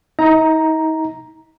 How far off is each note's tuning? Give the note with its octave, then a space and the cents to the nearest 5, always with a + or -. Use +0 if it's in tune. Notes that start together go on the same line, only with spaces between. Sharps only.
D#4 +40 A#5 +5